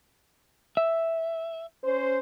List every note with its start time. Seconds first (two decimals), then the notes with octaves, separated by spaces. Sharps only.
0.77 E5
1.83 C#4 C5